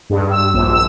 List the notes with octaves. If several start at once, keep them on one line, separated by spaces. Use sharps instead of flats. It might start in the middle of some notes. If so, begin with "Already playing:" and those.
G2
E6
A#1
E6